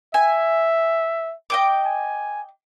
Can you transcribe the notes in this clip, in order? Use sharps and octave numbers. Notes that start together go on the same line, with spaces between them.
E5 G#5
D#5 G5 D6
G#5